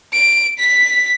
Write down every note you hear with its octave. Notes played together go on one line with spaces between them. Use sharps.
D7
B6